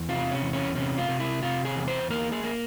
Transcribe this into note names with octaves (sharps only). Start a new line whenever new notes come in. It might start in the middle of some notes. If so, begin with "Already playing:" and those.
Already playing: E2
C3 F4
C#4
E2
C#4
C3 C#4
F4
C3
E4
C3 F4
G#4
E2
C5
A#3 A#4
G#4
A#3